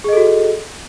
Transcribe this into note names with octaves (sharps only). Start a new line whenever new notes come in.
F#4 G#4 A4 D#5